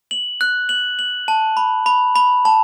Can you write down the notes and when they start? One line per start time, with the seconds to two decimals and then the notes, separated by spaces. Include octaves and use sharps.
0.11 F#7
0.41 F#6
0.69 F#7
0.99 F#7
1.28 A5
1.57 B5
1.86 B5
2.16 B5
2.45 A5